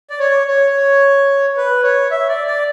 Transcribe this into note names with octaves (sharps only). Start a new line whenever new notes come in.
D5
C#5
C#5
B4
C#5
E5
D5
D5